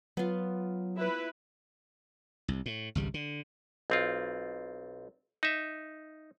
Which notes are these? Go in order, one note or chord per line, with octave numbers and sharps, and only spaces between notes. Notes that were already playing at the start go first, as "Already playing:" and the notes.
F#3 B3 F4
E4 B4
C2
A2
G#1 C#2 G3
D3
B1 C4 F4
D#4 E5